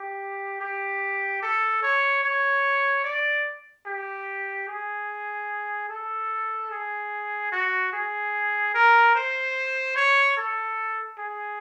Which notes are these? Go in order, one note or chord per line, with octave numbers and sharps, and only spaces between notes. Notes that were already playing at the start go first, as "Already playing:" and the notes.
Already playing: G4
G4
A4
C#5
C#5
D5
G4
G#4
A4
G#4
F#4
G#4
A#4
C5
C#5
A4
G#4